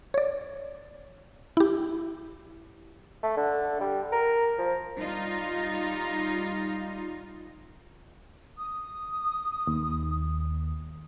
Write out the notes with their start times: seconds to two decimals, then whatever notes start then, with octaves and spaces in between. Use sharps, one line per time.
0.14 C#5 D5
1.57 E4 G4
3.23 A3
3.37 D3
3.81 G3
4.12 A#4
4.58 F3
5.00 G3 D#4 F4
8.58 D#6
9.67 D#2